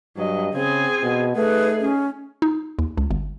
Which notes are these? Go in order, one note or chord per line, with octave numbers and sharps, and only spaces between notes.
G2 F#3 D#5
C#3 C4 G#4 G#5
B2
A3 D#4 G#4 B4
C#4
D#4
D#2
C#2
G1